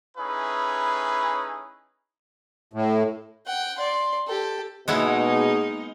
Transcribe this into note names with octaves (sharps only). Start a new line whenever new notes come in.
A3 C#4 D#4 E4 G#4 B4
A2
F#5 G5
D5 C6
G4 A4
B2 G#3 A#3 B3 D#4 E4 G#4